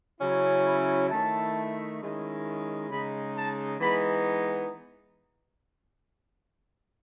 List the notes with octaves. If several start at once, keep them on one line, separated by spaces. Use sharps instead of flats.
C#3 F#3 C#4 E4
B5
D#3 A3 E4 A5
D#3 G#3 C#4 E4
C#3 G#3 D#4 B5
A5
E3 G#3 B3 D#4 B5